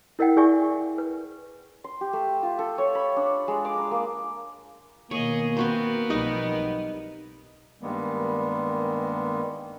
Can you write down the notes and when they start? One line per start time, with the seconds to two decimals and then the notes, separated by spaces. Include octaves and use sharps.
0.19 E4 A#4 D#5 F#5 G5
0.36 E4 G#4 D5 E5 G#5 C#6
0.98 B4
1.84 C6
2.01 G4
2.13 A3
2.43 F4
2.59 A4
2.78 C#5
2.95 B5
3.16 D4
3.48 G#3
3.65 D6
3.78 A#5
3.91 A#3
5.11 B2 D#3 A#3 G#4 C#5 D#5
5.57 B3 C4 F#4 A#4 C5
6.10 B1 F3 G3 D#4 D#5
7.82 G2 D#3 G3 G#3 A#3 B3